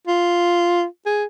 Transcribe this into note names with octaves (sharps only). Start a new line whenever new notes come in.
F4
G#4